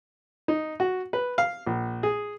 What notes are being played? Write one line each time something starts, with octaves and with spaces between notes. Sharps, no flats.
D#4
F#4
B4
F5
A#1
G#4